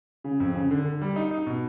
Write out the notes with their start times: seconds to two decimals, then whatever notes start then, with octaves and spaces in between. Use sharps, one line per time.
0.24 C#3
0.40 F2
0.55 C#3
0.71 D3
0.86 D3
1.02 G3
1.16 D#4
1.31 D#4
1.47 B2